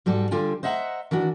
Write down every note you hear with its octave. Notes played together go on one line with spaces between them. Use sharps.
G#2 G3 F#4 A4
D3 G3 F4 G5 G#5
C5 D#5 E5 F#5 G#5 A#5
D#3 E3 D4 F#4